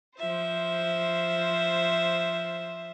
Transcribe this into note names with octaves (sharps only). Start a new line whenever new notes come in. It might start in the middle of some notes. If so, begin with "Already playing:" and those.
F3 C5 E5